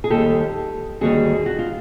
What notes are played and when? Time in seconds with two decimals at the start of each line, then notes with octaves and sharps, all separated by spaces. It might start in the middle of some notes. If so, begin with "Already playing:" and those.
0.04 G#4
0.10 D#2 D#3 G3 G4 A4
1.01 D#2 D3 G3 F#4 G#4
1.46 F#4
1.59 F4